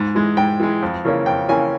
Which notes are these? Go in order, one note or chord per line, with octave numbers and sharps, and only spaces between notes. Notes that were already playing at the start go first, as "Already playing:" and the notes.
Already playing: G#2
E3 G#3
G#2 G5
E3 G#3
F2
C#3 E3 A#3 C#4
F2 G5
C#3 E3 A#3 C#4 G#5